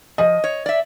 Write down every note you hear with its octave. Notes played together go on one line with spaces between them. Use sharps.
F3 D#5
C#5
D5 E5